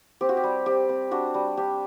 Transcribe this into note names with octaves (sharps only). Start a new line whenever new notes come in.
C4 G4
F#4
G4
G3
C4 G4
C4
D4 F#4
G3
D4 G4